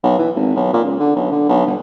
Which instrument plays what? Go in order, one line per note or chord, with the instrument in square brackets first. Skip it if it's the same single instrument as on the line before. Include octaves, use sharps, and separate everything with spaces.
[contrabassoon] B1
E3
G#1
B1
A#2
C#2
D3
B1
D3
B1
G1